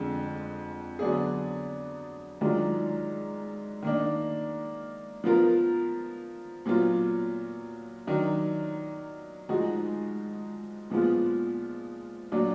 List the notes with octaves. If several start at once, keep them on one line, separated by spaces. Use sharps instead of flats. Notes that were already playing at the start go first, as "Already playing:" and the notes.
Already playing: F2 D3 G#3
D3 F#3 B3 D4 G#4
G#2 D#3 F#3 D4 F4
D#3 A#3 D4
F3 B3 F4 A#4
A#2 F#3 B3 F4
D#3 F#3 D4
G#2 F3 G#3 D#4 F#4
A#2 F3 G#3 B3 F4
A#2 F#3 D4